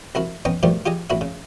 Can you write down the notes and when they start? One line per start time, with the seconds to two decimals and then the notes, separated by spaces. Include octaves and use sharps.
0.15 C2 E4 F#4 A#4
0.45 B3 C#4 D#4 D#5 G5
0.63 B2 D#3 F3 G3 A3 G4
0.86 F4 G4 G#4 D#5
1.10 A1 E4 F#4 E5
1.21 C#3